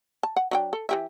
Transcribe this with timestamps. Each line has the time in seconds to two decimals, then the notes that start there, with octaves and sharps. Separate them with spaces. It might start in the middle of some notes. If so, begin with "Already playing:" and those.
0.23 A5
0.36 F#5
0.51 F#3 D4 G5
0.73 A4
0.89 E3 G4 E5